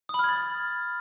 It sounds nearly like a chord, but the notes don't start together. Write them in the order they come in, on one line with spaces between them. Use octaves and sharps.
D#6 B5 F6 G#6 A6